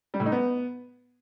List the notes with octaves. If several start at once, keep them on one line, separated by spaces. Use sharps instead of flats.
G3
A2
D#4
B3